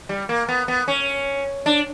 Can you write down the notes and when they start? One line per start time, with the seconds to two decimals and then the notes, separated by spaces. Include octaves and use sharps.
0.09 G3
0.29 A#3
0.48 B3
0.68 B3
0.88 C#4
1.66 D4